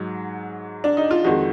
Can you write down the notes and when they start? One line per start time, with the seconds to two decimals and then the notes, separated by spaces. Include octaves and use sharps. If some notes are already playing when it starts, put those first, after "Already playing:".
Already playing: G#2 F#3
0.84 D4
0.97 D#4
1.11 F4
1.24 F2 D#3 G#3 F#4